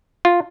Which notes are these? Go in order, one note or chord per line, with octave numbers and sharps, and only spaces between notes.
F4